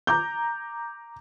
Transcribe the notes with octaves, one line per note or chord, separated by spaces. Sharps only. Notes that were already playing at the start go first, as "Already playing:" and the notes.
A#5 D6 G6